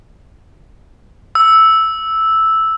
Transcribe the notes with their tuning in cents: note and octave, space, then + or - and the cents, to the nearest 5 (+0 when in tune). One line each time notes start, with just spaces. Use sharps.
E6 -5